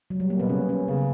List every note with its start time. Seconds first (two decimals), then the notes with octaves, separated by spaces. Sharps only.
0.10 F#3
0.20 G3
0.30 A#3
0.40 B2 B3
0.49 C#3 C#4
0.69 C#4
0.88 C#3 B3